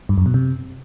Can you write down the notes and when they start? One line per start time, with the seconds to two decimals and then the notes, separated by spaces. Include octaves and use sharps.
0.09 G2
0.18 F#2
0.26 B2
0.34 C3